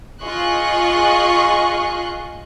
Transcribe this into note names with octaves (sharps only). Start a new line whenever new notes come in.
F4 G#4 D#5 C6 C#6 F#6